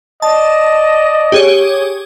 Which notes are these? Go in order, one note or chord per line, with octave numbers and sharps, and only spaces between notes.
D5 D#5 A5
G4 G#4 C#5